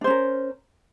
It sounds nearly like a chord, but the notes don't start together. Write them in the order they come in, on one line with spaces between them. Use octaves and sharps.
D4 C5 C#4 A#4